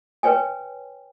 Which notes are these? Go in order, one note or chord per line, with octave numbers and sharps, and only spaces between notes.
B4 C#5 G5 G#5